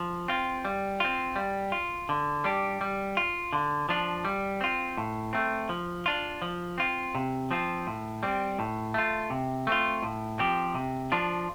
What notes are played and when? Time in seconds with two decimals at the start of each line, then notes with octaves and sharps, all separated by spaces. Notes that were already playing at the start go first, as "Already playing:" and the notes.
Already playing: F3
0.28 C4 F4
0.65 G3
1.00 C4 F4
1.36 G3
1.72 F4
2.09 D3
2.44 G3 D4 G4
2.81 G3
3.17 F4
3.53 D3
3.89 F3 D4 F4
4.25 G3
4.61 C4 F4
4.97 A2
5.33 A3 C4
5.69 F3
6.06 D4 F4
6.42 F3
6.78 C4 F4
7.15 C3
7.51 F3 C4 F4
7.87 A2
8.23 G3 C4
8.59 A2
8.94 A3 F4
9.30 C3
9.67 A3 C4 F4
10.03 A2
10.39 F3 C4 G4
10.75 C3
11.12 F3 D4 F4